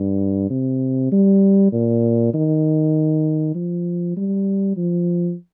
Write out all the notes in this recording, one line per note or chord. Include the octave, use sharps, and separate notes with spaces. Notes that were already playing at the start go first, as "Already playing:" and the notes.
Already playing: G2
C3
G3
A#2
D#3
F3
G3
F3